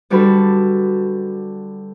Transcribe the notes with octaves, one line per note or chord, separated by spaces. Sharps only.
D3 G3 D4 F#4 A4 B4